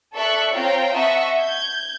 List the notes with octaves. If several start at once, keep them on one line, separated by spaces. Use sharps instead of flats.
A4 D5 E5 C#6 F#6
C4 F4 C#5 F5 G5 A#5
D#5 E5 F#5 A5 C#6
G6 G#6